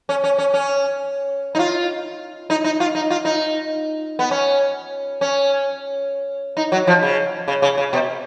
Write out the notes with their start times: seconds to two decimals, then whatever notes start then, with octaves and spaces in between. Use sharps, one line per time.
0.09 C#4
0.24 C#4
0.38 C#4
0.54 C#4
1.55 D#4
1.59 F4
2.50 D#4
2.64 D#4
2.80 F4
2.95 D#4
3.10 F4
3.25 D#4
4.19 B3
4.31 C#4
5.21 C#4
6.57 D#4
6.72 F#3
6.87 F3
7.02 C#3
7.48 C#3
7.62 C#3
7.78 C#3
7.93 B2